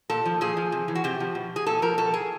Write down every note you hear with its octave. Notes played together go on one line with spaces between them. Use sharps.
A#2 A4
F3
A#2 G#4
F3
C3
E3
F#4
C3 G4
F3
B2
G#4
A#2 A4
F3 A#4
B2 A4
G#4